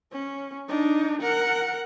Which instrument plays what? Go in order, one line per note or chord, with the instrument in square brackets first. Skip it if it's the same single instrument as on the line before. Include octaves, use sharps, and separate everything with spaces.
[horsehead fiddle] C#4
D4 D#4
A#4 F#5